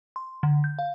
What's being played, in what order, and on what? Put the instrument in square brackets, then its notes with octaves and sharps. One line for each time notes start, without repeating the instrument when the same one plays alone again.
[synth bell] C6
D3
G6
F5